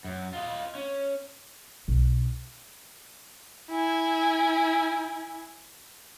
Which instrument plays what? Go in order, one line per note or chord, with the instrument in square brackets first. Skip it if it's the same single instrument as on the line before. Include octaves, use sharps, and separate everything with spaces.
[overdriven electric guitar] F#2
F4 D#5
C#4
[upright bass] B1
[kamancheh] E4 G#5